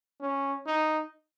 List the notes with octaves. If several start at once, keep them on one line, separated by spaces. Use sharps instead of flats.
C#4
D#4